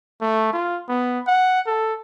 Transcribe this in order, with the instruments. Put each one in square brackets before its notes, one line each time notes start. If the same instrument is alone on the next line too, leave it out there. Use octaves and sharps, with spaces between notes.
[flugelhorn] A3
F4
B3
F#5
A4